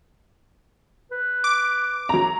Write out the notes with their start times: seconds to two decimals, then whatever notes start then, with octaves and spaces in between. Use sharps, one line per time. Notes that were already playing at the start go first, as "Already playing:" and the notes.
1.11 B4
1.44 D6
2.09 F#3 A#5